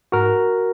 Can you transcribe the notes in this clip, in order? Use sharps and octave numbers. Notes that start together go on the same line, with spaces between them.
G#2 F#4 A#4